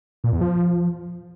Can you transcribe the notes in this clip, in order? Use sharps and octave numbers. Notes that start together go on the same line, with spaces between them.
A#2
E2
F3